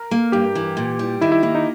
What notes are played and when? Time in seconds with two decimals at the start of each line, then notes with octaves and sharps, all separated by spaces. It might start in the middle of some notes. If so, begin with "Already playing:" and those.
Already playing: A#4
0.11 A#3
0.32 G2 G4
0.55 E3
0.77 A#2
0.99 G3
1.21 D#3 E4
1.32 E4
1.43 A#3 E4
1.55 D#4